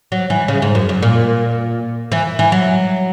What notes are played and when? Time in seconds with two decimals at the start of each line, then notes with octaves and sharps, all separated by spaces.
0.12 F#3
0.30 E3
0.48 C#3
0.62 G#2
0.75 F#2
0.89 F#2
1.02 A#2
2.12 E3
2.39 E3
2.52 F#3